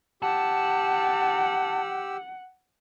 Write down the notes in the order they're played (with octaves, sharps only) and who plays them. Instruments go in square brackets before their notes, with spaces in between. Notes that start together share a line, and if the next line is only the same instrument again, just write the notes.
[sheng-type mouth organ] G4 E6 [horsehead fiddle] F#5 [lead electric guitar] A5